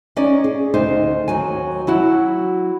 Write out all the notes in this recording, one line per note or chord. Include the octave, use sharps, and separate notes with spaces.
C#4 D#4 D5
G#4
D2 D#4 C5
D#2 F#3 G#5
F#3 E4 F#4